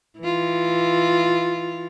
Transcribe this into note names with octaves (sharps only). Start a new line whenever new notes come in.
E3 F4